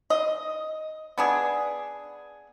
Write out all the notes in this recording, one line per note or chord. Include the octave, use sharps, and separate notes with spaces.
D#5
B3 D4 G#4